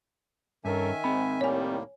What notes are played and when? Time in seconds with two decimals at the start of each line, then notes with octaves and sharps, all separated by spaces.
0.65 G2 D#3 C#4 A4 A#4 E5 G#5
1.04 G#2 C4 B5
1.41 C2 A2 D#3 G3 A#3 C#5 G#5